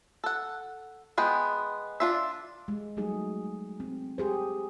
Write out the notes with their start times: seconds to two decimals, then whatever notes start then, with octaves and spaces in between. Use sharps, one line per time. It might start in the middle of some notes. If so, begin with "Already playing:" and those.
0.24 A4 F#5
1.18 G#3 B3 G5
2.00 D4 F4 E5
2.68 G#3
2.97 F#3 G3 A3 D#4 G#4
3.80 C4
4.18 G4 G#4 C5